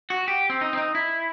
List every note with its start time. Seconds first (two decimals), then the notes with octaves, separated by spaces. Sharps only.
0.10 F#4
0.28 G4
0.50 C4
0.61 D#4
0.73 C4
0.77 D#4
0.95 E4